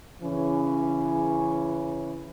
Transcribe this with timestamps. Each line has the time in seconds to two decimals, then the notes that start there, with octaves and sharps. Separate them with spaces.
0.22 C#3 E3 C#4